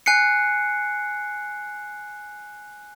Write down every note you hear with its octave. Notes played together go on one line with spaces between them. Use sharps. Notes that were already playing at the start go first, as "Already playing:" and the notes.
G#5 F#6 C7 C#7